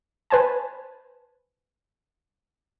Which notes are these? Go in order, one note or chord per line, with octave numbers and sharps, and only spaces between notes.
B4 C5 G#5 A5